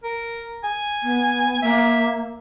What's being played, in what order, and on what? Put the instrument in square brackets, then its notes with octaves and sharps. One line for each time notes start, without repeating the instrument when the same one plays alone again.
[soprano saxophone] A#4
G#5
[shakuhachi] B3
[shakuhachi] A#3 [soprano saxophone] E5